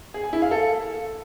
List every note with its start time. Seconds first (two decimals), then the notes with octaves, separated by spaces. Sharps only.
0.14 G#4
0.24 G#5
0.33 E4
0.42 F5
0.51 A4